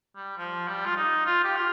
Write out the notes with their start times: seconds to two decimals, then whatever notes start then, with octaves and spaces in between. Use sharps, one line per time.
0.16 G3
0.37 F3
0.68 G3
0.86 F4
0.96 D#4
1.26 F4
1.44 G4
1.56 F4